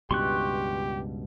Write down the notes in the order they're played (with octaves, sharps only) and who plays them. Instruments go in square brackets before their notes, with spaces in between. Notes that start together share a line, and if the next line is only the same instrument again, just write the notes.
[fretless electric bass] C#2 G2 B2 [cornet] G4 [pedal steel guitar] C6 C#6 F#6